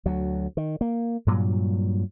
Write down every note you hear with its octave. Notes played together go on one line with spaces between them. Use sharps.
D2 F#3
D#3
A#3
G2 A#2 F#3